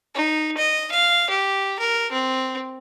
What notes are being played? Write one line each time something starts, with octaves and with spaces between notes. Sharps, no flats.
D#4
D#5
F5
G4
A#4
C4